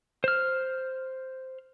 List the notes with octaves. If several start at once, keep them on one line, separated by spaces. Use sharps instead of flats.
C5 F6